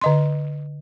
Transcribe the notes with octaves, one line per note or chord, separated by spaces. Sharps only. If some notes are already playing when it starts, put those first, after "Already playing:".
D3 D#5 C6